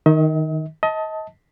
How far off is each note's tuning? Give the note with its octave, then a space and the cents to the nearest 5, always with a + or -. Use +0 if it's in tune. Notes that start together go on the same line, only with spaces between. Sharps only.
D#3 +0 D#5 +45
D#5 +30 A5 +0